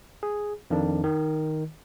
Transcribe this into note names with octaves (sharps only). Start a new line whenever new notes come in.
G#4
F2 D#3 D4
D#3